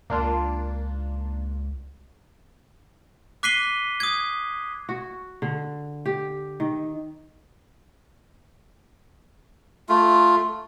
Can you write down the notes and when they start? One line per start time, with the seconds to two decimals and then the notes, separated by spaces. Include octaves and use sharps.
0.10 C#2 A#3 D4 F4
3.43 D6 F#6 B6 C7 D#7 G7
4.00 D#6 G#6
4.89 F#4
5.42 D3
6.06 G4
6.60 D#3
9.89 A3 F4